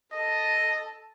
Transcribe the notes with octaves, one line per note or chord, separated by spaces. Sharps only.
A4 D#5 A5